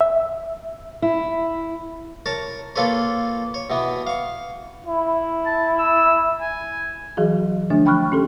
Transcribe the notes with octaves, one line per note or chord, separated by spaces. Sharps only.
E5
E4
A#4 C#5 A5
A#3 F4 A4 B4 C#5
C#5
B2 E3 B3
F5 C#6
E4
A5
E6
G#5
E3 F#3 F#4 G#4
D3 F3 A3 D4
G5 B5 C#6 F6 F#6
C#4 G4 A4